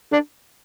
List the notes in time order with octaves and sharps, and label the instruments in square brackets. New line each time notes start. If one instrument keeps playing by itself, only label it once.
[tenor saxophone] D4